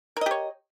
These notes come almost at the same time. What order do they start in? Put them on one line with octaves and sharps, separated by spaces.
A#4 D#5 G4 C#5